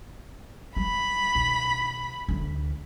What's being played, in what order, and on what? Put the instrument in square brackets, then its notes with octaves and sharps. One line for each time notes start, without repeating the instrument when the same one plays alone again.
[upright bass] E3 G3 [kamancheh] B5
[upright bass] B1 D#3
D2 E3